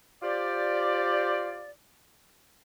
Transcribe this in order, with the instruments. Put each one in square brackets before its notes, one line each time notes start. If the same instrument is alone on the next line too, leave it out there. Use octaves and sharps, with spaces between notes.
[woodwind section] F4 G4 C5 D5